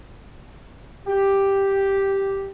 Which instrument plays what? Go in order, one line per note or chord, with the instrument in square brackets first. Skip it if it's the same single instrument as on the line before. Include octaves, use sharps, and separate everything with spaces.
[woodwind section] G4